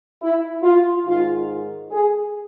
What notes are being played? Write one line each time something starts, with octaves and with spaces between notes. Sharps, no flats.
E4
F4
G#2 D#3 G#3 F4
G#4